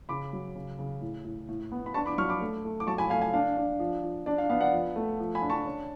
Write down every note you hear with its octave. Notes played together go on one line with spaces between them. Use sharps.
C#3 B5 D6
F#3
C#3
C#3
A2
A2
A2
B3
B5
D4 A5 C#6
B5 D6
F#3 C#6 F6
B5 D6
A3
A3
D6
F#3 A5 C#6
G#5 B5
A3 F5 G#5
F5 G#5
D4 F5
D4
F3
F3
D4 D5
F5
B3 F5
D5 F#5
F3
A3
F3
G#5 B5
D4
A5 C#6
C#4